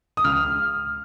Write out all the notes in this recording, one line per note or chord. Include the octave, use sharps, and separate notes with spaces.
D#6
C#2 F6